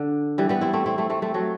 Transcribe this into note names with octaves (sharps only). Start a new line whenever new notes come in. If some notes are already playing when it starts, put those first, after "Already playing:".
Already playing: D3
E3 G3
G3 B3
C4 E4
A3 C4
C4 E4
A3 C4
A3 C4
A3 C4
F#3 A3